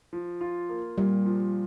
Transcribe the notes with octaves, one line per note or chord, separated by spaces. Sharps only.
F3
F4
A#3
A#2 G3
F3